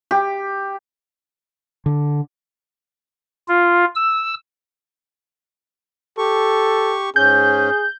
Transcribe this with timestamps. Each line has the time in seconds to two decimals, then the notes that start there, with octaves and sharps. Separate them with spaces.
0.11 G4
1.86 D3
3.48 F4
3.95 E6
6.18 G4 A4 C#6
7.16 G#2 C#4 G#4 G6